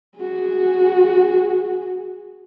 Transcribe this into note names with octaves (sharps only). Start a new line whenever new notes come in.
F#4 G#4